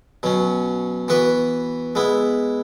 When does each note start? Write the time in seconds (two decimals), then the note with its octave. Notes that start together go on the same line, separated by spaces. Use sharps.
0.23 B2 F#3 C#4
1.08 E3 B3 F#4 B4
1.95 G#3 B3 E4